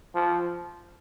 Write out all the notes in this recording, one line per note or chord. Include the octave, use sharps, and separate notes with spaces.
F3